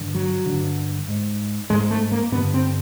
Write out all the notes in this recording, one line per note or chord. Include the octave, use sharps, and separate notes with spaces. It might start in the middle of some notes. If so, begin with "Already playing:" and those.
Already playing: G2 D3
F#3
G2 D3
G#2
G#2 G#3
A3
A#3
G2 D3 B3
C4